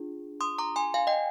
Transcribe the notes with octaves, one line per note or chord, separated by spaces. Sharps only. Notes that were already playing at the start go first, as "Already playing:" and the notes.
Already playing: D4 F4 G#4
C6 D#6
A#5 D6
G#5 C6
F5 G#5
D#5 G5